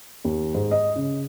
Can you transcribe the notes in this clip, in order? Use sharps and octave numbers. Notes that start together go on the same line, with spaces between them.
D#2
G#2
D#5
C#3